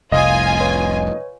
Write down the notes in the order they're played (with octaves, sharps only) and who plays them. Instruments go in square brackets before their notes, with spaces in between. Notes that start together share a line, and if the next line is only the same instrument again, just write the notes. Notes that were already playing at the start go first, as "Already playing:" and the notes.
[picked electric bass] F1 C2 [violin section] F4 G#5 [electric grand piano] D#5 [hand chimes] F5 D#6
[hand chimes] B4 C#5